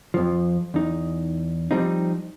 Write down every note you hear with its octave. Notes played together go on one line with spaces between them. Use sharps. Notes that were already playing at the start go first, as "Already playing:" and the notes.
F2 F3
E2 D#4
F3 G3 C4 D#4